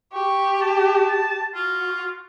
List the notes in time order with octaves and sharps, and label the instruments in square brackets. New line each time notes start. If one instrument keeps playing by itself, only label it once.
[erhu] G4 [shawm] C#6
[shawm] A5
[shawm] F4 [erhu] F#4